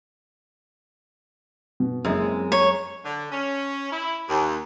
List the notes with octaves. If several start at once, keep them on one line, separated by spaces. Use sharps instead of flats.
B2
F#1 F#2 G#3 E4
C4
C#5 A#5
D3
C#4
E4
D#2